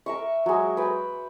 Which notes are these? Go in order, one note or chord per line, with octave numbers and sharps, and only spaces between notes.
A#4 E5 C#6
F#3 G#3
B4 G5